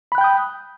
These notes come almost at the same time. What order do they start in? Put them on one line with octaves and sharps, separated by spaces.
B5 F#6 G5 G6 D#6